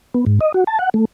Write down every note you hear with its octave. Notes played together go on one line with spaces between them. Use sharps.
B3
G#2
D#5
F#4
A5
F#5
A3